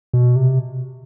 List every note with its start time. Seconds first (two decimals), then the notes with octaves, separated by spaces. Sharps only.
0.13 B2
0.36 C3